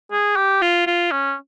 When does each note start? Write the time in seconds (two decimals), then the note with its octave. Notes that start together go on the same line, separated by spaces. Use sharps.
0.12 G#4
0.36 G4
0.62 F4
0.87 F4
1.11 C#4